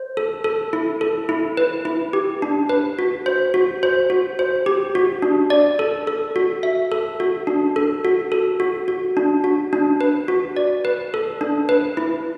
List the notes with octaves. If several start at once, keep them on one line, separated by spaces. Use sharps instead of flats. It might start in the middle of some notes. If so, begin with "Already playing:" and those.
Already playing: C5
A4
A4
E4
A4
E4
B4
E4
G4
D4
B4
F#4
C5
F#4
C5
F#4
C5
G4
F#4
D4
D5
A4
A4
F#4
E5
A4
F#4
D4
A4
F#4
A4
F#4
F#4
D4
F#4
D4
B4
F#4
D5
B4
A4
D4
B4
E4